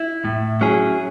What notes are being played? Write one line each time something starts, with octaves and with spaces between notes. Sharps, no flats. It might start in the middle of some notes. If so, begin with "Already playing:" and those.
Already playing: E4
A2
F#3 C#4 E4 G#4